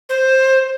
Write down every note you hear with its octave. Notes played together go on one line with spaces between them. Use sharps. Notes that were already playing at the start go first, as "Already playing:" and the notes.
C5